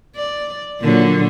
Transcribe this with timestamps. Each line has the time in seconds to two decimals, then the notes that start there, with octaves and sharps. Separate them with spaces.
0.16 D5
0.81 A#2 D3 F#3